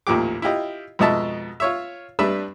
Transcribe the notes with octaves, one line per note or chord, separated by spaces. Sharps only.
A1 D#2 A#2 F3 G4 D6
E4 F4 G4 D#5
F2 G#2 B2 D#5 E5 A5
F4 C#5 E5
G2 G3 D4 B4 E5 E6